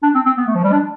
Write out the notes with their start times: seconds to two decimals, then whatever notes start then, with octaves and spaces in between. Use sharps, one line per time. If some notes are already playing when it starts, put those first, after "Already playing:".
0.03 D4
0.15 C4
0.26 C4
0.37 B3
0.47 A3
0.55 F3
0.64 G3
0.72 D4